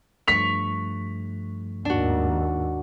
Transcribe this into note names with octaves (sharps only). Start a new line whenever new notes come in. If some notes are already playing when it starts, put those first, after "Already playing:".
G2 F3 A3 C#6 B6 F7
D#2 G#2 D4 F#4